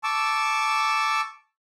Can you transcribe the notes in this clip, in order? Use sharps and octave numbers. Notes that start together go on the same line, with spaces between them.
A5 C#6 D6 E6